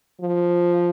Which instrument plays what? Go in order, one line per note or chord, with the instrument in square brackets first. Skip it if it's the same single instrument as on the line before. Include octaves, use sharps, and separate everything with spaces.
[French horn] F3